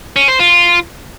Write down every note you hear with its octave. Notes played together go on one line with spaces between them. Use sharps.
C#4
C5
F4